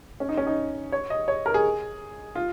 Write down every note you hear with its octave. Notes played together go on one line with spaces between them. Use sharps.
C#4
D#4
C#4
D#4
C#5
D#5
C#5
A#4
G#4
F4